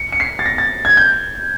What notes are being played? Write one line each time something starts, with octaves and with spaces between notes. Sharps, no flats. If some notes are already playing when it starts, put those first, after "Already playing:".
Already playing: C#7
C#7
C7
A6
A#6
A6
G#6
G6